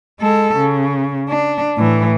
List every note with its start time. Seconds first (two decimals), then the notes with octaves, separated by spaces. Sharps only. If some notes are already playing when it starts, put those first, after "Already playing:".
0.20 G#3 A4
0.57 C#3
1.29 D4
1.77 A2 E3